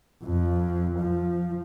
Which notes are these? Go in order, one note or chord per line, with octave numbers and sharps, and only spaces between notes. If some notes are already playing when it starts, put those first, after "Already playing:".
F2
F3